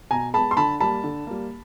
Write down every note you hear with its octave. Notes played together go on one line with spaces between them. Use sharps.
B2 G#5 A#5
G#3 B3 A5 B5
C6
D3 A5 B5
G3 A#3 A5 B5
D3
G3 A#3